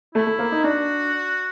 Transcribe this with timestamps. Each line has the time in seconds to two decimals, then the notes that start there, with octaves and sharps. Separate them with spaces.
0.15 A3 E4
0.27 A3
0.39 A#3
0.52 D#4
0.64 D4 F#4